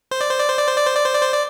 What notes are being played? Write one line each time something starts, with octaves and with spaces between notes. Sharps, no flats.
C5
D5
C5
D5
C5
D5
C5
D5
C5
D5
C5
D5
C5
D5